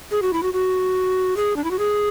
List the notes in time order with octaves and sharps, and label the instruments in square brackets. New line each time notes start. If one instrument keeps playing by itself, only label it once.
[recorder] G#4
F#4
E4
F#4
F#4
G#4
D4
E4
F#4
G#4